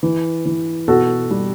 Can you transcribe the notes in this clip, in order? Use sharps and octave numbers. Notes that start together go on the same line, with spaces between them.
E3
E3
B2 F#4 A4
G3